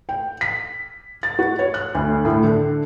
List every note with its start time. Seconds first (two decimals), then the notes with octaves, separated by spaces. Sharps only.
0.09 G5
0.41 B6
1.23 A6
1.39 F#4
1.59 C#5
1.74 F#6
1.95 D2
2.25 A2
2.44 D3